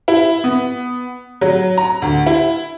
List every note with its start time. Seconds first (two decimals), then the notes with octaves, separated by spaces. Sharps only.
0.08 E4
0.44 B3
1.41 F#3
1.78 A#5
2.02 D2
2.26 E4